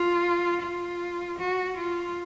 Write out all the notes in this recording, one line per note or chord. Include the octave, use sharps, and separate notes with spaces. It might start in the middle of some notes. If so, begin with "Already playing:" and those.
Already playing: F4
F4
F#4
F4